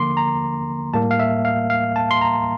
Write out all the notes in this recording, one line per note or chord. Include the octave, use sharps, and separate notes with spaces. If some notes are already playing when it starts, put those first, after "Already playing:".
Already playing: D3 F3 A#3 C6 D6
A#5
A2 G3 A#3 A5
F5
E5
F5
F5
A5
C6
A#5